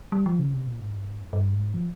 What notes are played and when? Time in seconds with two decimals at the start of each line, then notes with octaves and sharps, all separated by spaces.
0.12 G3
0.26 F3
0.39 C#3
0.54 C3
0.67 A#2
0.80 G#2
0.94 G2
1.07 G#2
1.21 F2
1.33 G2
1.53 G#2
1.74 F3